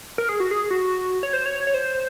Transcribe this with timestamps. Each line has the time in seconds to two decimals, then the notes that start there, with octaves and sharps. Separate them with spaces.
0.18 A#4
0.29 G#4
0.40 F#4
0.51 G#4
0.71 F#4
1.23 C#5
1.33 C5
1.46 C#5
1.67 C#5
1.74 C5